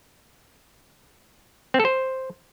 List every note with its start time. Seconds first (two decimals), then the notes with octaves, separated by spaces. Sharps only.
1.74 C4
1.80 A4
1.85 C5